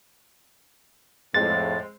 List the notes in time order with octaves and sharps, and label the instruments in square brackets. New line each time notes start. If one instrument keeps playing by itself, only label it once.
[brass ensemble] F2 A2 [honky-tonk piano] G#3 C4 C5 [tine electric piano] A6